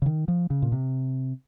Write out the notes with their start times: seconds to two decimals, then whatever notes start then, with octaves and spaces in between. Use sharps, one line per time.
0.02 C#3
0.06 D#3
0.28 F3
0.50 C#3
0.62 A#2
0.72 C3